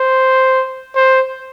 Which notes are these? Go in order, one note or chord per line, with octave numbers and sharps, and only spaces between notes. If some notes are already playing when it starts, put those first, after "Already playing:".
Already playing: C5
C5